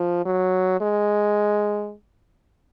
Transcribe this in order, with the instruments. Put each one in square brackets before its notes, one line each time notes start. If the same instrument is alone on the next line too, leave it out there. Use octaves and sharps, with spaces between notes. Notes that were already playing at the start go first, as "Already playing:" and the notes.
Already playing: [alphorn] F3
F#3
G#3